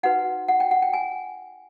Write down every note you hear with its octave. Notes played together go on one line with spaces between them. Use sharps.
D#4 F#4 B4 F#5
F#5
G5
F#5
G5
G#5